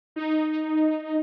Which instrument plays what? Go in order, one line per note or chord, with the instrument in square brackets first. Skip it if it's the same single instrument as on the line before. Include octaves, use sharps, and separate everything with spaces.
[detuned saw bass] D#4